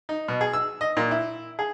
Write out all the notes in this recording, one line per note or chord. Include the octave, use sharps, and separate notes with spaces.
D#4
B2
G#4
E6
D#5
A#2
E4
G#4